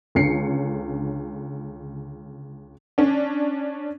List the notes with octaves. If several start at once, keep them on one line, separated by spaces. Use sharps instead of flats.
C#2 D3 C#4 C7 C#7
C#4 D4